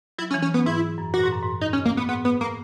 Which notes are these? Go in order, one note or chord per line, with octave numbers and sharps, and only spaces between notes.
F#3 E4
C#4
E3
C#4
B3
G#2 E4
F#2
A#2 F#4
G#2
F#2
G#2
D#4
C#4
A#3
B3
G#2 B3
B3
A#3